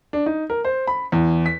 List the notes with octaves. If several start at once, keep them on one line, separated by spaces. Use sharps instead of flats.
D4
D#4
A#4
C5
B5
E2
B6